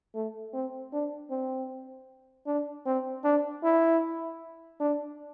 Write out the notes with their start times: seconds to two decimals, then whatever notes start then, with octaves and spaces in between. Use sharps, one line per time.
0.15 A3
0.54 C4
0.93 D4
1.30 C4
2.47 D4
2.86 C4
3.24 D4
3.63 E4
4.80 D4